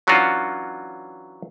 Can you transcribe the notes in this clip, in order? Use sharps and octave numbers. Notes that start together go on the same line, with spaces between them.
E3 F#3 C#4 D4 F4 F#4